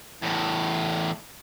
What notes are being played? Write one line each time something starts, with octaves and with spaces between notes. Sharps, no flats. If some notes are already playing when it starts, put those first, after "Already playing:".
E2 A2